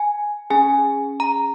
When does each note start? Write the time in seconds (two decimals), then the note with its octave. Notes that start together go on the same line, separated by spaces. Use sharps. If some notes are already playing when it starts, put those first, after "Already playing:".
Already playing: G#5
0.50 C#4 G#4 G#5
1.20 A#5